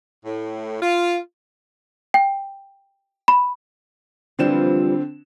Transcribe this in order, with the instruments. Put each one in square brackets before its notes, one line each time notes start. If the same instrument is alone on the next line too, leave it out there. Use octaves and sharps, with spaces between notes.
[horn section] A2
F4
[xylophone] G5
B5
[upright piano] D3 C4 E7 [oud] E3 F3 G3